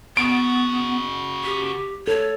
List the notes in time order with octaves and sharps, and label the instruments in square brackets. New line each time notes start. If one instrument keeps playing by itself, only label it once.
[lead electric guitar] C#3 F#4 [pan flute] B3 [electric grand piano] D7
[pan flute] G4
[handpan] A4 [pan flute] C#5